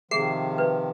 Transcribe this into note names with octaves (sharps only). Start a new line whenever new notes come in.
C3 D#3 F3 G#4 E5 C7
B4